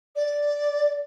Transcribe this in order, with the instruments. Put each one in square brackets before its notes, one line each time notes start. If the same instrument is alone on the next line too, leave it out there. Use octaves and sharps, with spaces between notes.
[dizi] D5